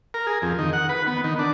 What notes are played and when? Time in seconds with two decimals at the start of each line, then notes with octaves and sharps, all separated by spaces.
0.14 A#4
0.27 G#4
0.42 F2
0.59 D#3
0.73 F#5
0.89 B4
1.07 B3
1.24 D#3
1.39 D4